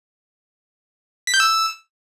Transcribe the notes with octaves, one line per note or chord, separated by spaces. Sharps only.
B6
G6
E6